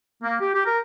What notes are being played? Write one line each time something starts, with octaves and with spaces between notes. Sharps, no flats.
A#3
G4
G4
A#4